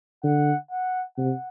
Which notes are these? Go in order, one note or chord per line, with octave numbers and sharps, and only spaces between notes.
D3 F#5
F#5
C3 F#5